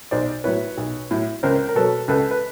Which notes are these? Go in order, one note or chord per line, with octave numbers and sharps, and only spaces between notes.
B1 C5 D5
A2 F#3 B4 C#5
B1
A2 F#3
C#2 A#4 C5
A#4
B2 F#3 A4 B4
C#2 A4 B4
B4